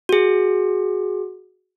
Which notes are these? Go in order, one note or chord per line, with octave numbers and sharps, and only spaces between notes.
F#4 G#4